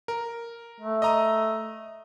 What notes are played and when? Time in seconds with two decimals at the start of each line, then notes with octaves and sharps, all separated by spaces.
0.08 A#4
0.81 A3
1.02 D#5 A#5 D#6